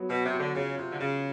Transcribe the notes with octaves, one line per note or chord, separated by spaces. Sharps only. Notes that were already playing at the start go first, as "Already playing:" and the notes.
Already playing: F#3 B3
B2 F#4
C3
F#4
D3
C#3 F4
C3 F4
D3
C#3 F4